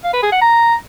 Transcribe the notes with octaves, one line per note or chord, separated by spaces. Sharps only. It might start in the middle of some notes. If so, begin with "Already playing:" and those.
F5
B4
G#4
F#5
A#5